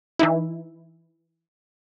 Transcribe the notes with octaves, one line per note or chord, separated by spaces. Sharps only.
E3 D#4 E4